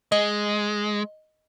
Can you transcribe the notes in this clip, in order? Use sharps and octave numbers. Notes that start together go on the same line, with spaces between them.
G#3 D#5